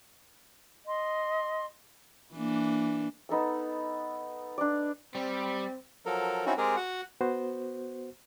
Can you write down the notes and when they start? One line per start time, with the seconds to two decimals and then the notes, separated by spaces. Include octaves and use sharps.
0.86 D#5 C6
2.35 E3 A#3 D4
3.29 B3 D#4 A4 E6
4.58 D4 D5
5.15 G3 C4
6.06 F3 F#3 A4 A#4
6.46 C4 C#4 D#4 E4 F#4
6.58 G#3 C4 G4 G#4 A#4
6.77 F#4 F#5
7.21 B3 F#4 C5